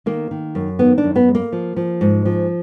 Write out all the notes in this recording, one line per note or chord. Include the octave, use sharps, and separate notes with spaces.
D#3 A#3
D#3
F#2
D#3 B3
D4
F#2
B3
G#3
A#3
F3
F3
G#2
F3